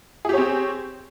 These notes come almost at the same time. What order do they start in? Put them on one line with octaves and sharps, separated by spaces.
G#4 G4 C#5 C4